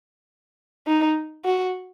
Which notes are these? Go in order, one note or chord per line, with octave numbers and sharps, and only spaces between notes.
D#4
F#4